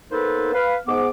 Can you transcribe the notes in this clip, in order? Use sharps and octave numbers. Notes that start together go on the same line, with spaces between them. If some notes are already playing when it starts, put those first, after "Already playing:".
A#3 B3 D#4 A4 B4 C5
B4 F5
G#2 B3 D6